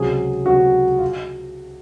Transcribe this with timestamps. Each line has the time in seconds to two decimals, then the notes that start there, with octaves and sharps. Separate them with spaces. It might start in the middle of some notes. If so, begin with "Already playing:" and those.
Already playing: C#2 C3 F#3 G#4
0.46 C#2 C3 F#3 F#4
0.98 F4